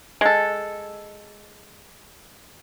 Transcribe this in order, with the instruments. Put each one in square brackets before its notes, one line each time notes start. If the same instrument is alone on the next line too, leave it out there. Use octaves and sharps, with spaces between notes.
[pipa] G#3 A4